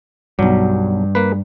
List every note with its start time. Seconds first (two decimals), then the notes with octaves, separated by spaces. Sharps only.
0.39 B1 G2 F#3 G3
1.15 A#3 B4